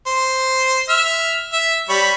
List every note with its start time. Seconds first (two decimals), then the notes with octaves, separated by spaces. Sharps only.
0.07 C5
0.89 E5 F6
1.53 E5
1.89 G3 C#5 B5